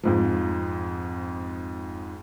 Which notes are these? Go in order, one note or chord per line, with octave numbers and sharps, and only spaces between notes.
F2 G#2 F3